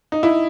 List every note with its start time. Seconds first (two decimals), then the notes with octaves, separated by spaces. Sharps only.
0.12 D#4
0.23 E4